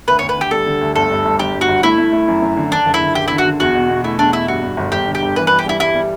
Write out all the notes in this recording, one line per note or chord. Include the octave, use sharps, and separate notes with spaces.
D2 B4
D2 C#5
B4
D3 G4
G3 A4
D3
D2
G1 A4
G2
G1
G1 G4
G2
F#4
G1
A3 E4
A3
A3
F#2
F#2
D3
D3 D4
F#1
E4
D3
F#1 G4
D3 E4
F#4
D3
E2 F#4
B2
B2
A3 E4
E2 D4
B2 E4
G2 F#4
G2
G1
G1 G4
D3
G4
G1
E3 B4
G2 B4
G4
G3 E4
G3 E4
G3